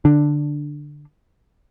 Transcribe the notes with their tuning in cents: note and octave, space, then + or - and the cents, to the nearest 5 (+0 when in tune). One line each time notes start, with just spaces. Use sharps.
D3 +0 D4 +10